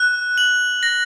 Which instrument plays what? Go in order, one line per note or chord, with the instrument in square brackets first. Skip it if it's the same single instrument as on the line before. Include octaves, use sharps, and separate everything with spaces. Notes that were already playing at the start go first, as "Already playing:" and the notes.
Already playing: [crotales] F#6
F#7
A#6